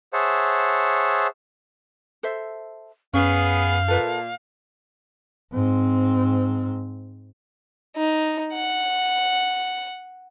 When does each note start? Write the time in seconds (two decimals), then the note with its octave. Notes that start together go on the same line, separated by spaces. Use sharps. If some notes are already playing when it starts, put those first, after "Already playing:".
0.13 G#4 C5 C#5 E5 F#5 A5
2.23 A4 C5 E5
3.14 F#2 B3 C#4 G#4 F5
3.88 A#2 A4 B4 E5
5.53 G#2 C4
7.96 D#4
8.54 F#5